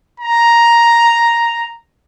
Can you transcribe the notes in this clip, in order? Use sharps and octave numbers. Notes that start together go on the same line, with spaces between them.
A#5